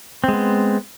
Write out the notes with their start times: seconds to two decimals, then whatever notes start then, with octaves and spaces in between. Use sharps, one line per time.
0.24 C4
0.28 G#3
0.33 B3